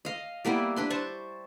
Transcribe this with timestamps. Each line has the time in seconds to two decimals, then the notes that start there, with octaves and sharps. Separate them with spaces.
0.05 D#5 F5
0.45 G3 A#3 B3 E4
0.76 D4 B4 C6
0.90 C5 A5 C#6